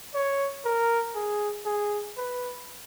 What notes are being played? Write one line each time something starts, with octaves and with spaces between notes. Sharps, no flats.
C#5
A#4
G#4
G#4
B4